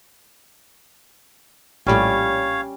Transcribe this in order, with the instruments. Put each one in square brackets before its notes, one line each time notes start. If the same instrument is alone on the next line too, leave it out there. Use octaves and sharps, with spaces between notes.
[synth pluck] A#1 A2 [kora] G3 C#4 [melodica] C#5 F5